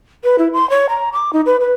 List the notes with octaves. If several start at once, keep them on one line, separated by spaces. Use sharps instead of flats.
B4
E4
C6
C#5
A#5
D6
D#4
B4
B4